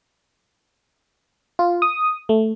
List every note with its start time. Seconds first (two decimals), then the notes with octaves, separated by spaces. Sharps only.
1.59 F4
1.82 D#6
2.29 A3